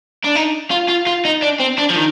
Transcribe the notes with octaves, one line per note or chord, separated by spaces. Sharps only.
D4
D#4
F4
F4
F4
D#4
D4
C4
D4
F3
D#3